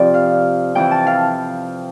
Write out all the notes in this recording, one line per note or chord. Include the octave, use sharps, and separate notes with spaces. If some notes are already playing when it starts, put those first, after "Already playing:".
Already playing: F2 C3 F3 D5
F5
F2 E3 G5
A5
F5